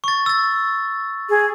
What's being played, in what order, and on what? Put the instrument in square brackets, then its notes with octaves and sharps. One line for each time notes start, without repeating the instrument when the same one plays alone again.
[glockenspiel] C#6 A6
E6 A6
[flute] G#4